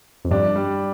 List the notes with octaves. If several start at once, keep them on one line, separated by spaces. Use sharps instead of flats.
F2
G2 D4
G3